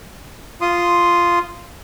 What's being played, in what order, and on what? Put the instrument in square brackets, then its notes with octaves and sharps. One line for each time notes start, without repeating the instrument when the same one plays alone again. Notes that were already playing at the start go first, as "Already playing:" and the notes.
[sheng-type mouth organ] F4 C6 D#6